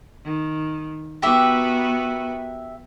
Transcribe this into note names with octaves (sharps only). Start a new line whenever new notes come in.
D#3
B3 F#4 G4 A#4 B4 E5